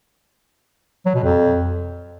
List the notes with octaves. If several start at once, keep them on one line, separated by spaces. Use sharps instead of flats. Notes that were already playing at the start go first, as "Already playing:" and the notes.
F#3
B2
F2